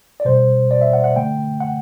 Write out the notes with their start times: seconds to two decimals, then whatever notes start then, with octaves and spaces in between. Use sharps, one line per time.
0.20 D5
0.25 B2 G3 C5
0.71 D5
0.81 E5
0.93 F#5
1.04 F#5
1.16 D3 A3 G5
1.60 F#5